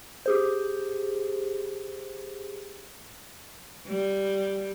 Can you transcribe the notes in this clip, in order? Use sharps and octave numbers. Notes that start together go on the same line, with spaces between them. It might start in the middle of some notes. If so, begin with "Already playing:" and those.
G4 G#4 C5
G3